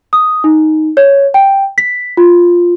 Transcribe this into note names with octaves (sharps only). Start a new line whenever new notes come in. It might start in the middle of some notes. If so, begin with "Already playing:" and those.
D#6
D#4
C#5
G5
B6
F4